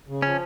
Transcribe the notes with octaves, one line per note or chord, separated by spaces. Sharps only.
C#3
F3 C#4